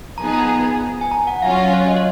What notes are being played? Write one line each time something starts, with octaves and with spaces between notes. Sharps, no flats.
F3 B3 D#4 G#4 A#5
A#5
G#5
A#5
F#5
F#3 C#4 F4 F5
F5
C#5
D#5
C#5